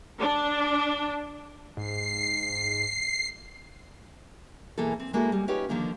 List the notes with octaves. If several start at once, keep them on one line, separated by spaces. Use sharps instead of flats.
D4
G#2 C7
B2 E3 A#3 G#4 A4
C4
G#3 A#3 E4 F#4 G#4 A4
G3 G#3
C#4 D#4 F4 G4 B4 C#5
D3 D#3 F3 A#3 F4